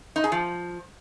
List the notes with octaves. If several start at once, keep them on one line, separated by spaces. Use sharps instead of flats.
D#4
G#4
F3